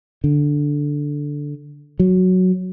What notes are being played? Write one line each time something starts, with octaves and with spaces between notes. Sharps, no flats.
D3
F#3